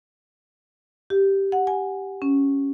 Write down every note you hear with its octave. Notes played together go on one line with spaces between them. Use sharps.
G4
F#5
G#5
C#4